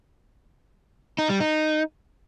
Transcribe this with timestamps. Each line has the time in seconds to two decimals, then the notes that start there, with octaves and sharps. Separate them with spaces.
1.18 D#4
1.29 G3
1.40 D#4